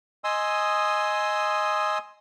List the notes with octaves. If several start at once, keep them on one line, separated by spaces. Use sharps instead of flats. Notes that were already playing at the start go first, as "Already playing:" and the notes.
D#5 G#5 C6 D#6 E6